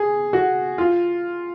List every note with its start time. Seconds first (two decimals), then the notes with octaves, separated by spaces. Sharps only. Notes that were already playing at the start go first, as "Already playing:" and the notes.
Already playing: G#4
0.33 F#4
0.78 F4